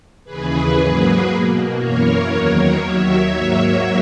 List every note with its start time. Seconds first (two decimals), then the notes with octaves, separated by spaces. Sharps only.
0.24 D#2 C#3 E3 G#4 B4
0.76 G#2 F#3 A#3
1.26 B2 A#3
1.77 F#2 E3 A#3 A#4 C#5
2.27 E2 D#3 F#3 A#3 A#4 C#5
2.78 D#2 D#3 F#3 C#5 E5
3.30 G#2 F#3 A#3 C#5 E5